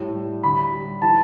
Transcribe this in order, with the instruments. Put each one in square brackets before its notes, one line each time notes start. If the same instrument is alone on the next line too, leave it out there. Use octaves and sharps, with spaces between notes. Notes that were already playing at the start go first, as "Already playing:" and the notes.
Already playing: [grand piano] A2 G3
G3
D2 B5
G3
E3 A5